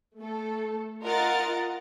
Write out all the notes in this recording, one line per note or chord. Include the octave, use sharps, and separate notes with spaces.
A3 A4
F4 A#4 D#5 F#5 A#5 A6